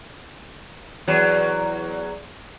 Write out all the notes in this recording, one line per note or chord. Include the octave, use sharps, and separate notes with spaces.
E2 F#3